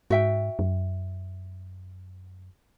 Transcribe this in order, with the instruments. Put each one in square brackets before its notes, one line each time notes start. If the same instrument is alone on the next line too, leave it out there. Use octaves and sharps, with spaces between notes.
[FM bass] G#2 [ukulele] F#4 E5 G5
[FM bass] F#2